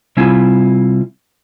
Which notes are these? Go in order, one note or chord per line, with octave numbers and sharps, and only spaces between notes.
C3 G3 C4 E4 F4 G#5